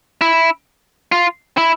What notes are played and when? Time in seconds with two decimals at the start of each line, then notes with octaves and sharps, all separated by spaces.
0.21 E4
1.12 F4
1.57 E4